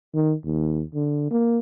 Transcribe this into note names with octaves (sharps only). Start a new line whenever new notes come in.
D#3
D#2
D3
A#3